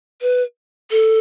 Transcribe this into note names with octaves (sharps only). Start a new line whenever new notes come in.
B4
A4